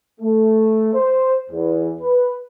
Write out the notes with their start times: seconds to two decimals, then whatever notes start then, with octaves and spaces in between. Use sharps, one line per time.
0.20 A3
0.93 C5
1.51 E2
2.00 B4